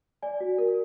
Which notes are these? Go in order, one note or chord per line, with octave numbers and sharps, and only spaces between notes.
D5 G#5
F#4
A#4